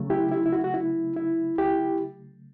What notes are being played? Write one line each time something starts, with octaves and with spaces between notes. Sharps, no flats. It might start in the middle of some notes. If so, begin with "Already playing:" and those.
Already playing: C#3 F#3 A3
E4 G4
E4
E4
F#4
F#4
E4
E4
E4 G4